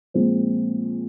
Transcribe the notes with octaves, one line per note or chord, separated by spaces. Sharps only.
A#2 F3 G#3 C4